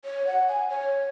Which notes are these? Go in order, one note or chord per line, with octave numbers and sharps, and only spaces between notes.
C#5
F#5
G#5
C#5